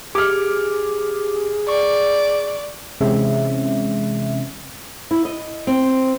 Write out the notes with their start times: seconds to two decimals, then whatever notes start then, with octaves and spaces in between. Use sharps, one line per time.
0.15 G4 G#4 D6 F6
1.69 D5 C#6
3.01 C3 E3 G#3 C4 C#4 E5
5.11 E4
5.25 D#5
5.67 C4